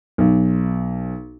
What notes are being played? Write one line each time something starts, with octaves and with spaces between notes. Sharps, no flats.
B1